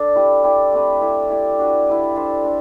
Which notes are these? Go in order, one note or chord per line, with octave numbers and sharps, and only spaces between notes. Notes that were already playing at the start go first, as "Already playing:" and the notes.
Already playing: D4 A4 D5
E4 G4 B4
E4 G4 D5
A3 C4 G4 B4
E4 A4 E5
E4 G4 D5
D4 F#4 B4
E4 G4 B4 D5
D4 A4 C5 E5
D4 A4